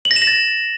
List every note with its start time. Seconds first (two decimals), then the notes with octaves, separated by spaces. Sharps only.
0.05 F#7
0.11 A#6
0.16 E7
0.22 A#6
0.27 A6